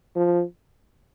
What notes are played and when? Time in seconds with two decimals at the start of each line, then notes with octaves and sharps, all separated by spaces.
0.16 F3